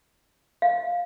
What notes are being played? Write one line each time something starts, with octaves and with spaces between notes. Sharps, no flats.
F5